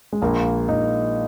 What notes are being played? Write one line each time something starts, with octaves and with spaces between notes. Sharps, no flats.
G#3
A#1 A#3
A#1 D#4